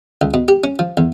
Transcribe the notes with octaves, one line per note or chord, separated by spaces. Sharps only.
C#2
B2
G4
C#4
F3
E2